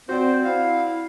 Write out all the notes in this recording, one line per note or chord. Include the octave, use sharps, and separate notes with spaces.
C4 F#4 C5 D5
E4 F5